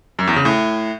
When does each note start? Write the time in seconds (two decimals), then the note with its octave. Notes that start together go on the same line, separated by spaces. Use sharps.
0.19 F#2
0.27 E2
0.36 C#3
0.45 A2